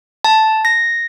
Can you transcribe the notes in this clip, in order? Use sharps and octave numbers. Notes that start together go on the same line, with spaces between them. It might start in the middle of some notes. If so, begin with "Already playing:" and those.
A5
A#6